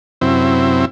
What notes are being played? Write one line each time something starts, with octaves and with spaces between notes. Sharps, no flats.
F#2 C3 C4 E4